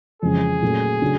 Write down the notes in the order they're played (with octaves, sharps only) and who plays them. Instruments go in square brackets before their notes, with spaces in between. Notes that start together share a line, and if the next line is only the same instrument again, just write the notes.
[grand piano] F2 C#3 E3 G#3 C#4 [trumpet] G#4
[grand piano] A#2 F#3 A3 C#4
C#3 F#3 A3 D4